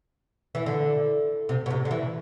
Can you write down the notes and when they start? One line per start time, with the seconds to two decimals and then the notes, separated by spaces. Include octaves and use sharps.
0.55 E3
0.66 D3
1.49 C3
1.66 B2
1.70 C3
1.85 D3
1.91 E3